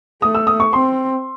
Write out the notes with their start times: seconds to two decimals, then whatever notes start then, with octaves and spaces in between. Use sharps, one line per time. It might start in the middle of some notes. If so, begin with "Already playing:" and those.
0.22 A3 D#6
0.35 E6
0.47 D#6
0.60 C#6
0.73 C4 C6